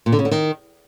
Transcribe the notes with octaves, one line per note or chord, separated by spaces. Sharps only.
A#2
D3
C#3
D3
D#3